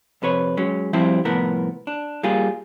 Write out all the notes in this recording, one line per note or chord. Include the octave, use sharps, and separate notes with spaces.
F2 C3 B4 C#5
F#3 G#3 C#4
G2 F3 G3 C4 E4
C2 A2 F3 B3 A#4
D4
G3 A#3 F4 G#4